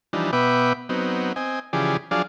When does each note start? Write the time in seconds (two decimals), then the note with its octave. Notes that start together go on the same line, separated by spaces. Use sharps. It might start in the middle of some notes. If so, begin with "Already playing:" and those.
0.13 E3 F3 G3 D4 D#4
0.33 B2 B3 B4 E5 G5 D6
0.89 F#3 B3 C4 D#4
1.36 C4 D#5 G#5
1.73 C#3 E3 F3 G4 G#4 D5
2.11 F3 F#3 D4 G#4 D5 F5